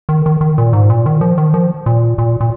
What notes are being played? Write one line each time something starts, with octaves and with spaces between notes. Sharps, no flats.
D#3
D#3
D#3
A#2
G#2
A#2
D#3
F3
D#3
F3
A#2
A#2
A#2